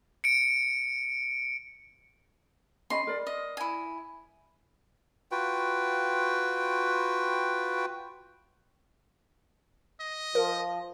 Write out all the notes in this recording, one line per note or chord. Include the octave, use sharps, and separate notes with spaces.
C#7 D7
C#4 D#5 B5 C6
A#4 D5
D#5
E4 G#5
F4 F#4 B4 G5
D#5
F3 A#4